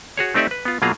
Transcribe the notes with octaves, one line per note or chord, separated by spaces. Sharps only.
F#4 G#4 C#5
A3 C4 D#4 G4 D5 E5
B4
B3 F4
B2 F#3 A#3 F4 G#4 A#5